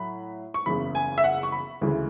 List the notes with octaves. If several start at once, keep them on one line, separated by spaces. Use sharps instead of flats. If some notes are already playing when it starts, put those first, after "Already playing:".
Already playing: A2 F#3 B5
C#6
F#1 E2 C#3 B5
G#5
E5
F#5
C#6
B5
D2 C#3 E3 G#3